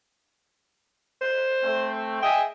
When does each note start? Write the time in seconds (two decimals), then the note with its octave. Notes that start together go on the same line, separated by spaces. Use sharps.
1.21 C5
1.63 A3 C4
2.22 G#4 D#5 E5 G5